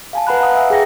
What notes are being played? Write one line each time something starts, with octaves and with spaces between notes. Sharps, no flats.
F5 G#5 A5
B4 F#5 A#5 B5 F#6
F5 F#5 A#5 D#6
E5 G#5 E6
G#4 G5 A#6